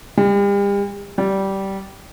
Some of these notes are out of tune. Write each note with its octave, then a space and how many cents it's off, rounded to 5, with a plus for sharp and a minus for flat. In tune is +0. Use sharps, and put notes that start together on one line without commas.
G3 +40
G3 -15